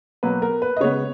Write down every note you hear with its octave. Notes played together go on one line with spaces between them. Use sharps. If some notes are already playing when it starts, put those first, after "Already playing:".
B2 F#3 A#3 B4
A#4
B4
D#5
C#3 G#3 B3 C#5